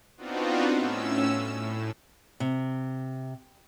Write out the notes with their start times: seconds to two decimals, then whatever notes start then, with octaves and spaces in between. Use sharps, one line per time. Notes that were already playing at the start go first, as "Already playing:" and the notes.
0.17 B3 C4 D4 D#4 F4 F#4
0.77 A2 C#4 E6
1.54 A2
2.40 C3